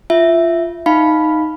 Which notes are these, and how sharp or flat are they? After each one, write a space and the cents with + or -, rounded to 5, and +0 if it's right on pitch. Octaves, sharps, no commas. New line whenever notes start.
F4 -15 E5 +0
D#4 +0 F5 +0 B5 +0